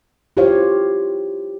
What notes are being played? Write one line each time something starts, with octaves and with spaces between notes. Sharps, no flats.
E4 F4 G4 C5 C#5 F5